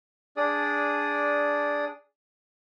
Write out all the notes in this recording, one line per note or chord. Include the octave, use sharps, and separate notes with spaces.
D4 G#4 D5 D#6